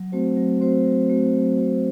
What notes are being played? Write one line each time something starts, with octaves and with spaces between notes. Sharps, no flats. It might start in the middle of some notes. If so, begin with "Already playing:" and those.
Already playing: F#3
A3 C4 F#4 C5
F#3
A3 C4 F#4 C5
F#3
A3 C4 F#4 C5
F#3
A3 C4 F#4 C5